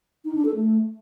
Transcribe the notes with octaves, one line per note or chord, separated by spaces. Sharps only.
D#4
D4
A4
A3